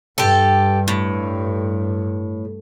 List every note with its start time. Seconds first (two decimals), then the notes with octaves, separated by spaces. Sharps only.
0.18 G2 G4 A4
0.88 A2